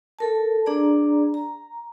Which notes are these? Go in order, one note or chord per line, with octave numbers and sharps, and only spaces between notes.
A4 A#4 A5
D4 G#4 D5 A#5
A#5